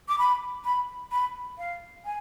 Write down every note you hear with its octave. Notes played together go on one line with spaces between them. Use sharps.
D6
B5
B5
B5
F5
G#5